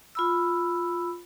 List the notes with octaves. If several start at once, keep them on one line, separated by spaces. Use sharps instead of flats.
F4 B5 E6